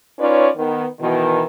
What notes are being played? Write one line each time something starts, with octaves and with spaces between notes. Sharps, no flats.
C#4 D#4 F4 B4 C#5 D5
D#3 B3
B2 D#3 E3